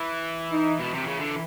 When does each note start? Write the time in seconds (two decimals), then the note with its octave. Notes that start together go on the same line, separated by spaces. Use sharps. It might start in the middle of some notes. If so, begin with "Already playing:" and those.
Already playing: E3
0.52 D#4
0.79 B2
0.94 C3
1.06 C#3
1.20 D3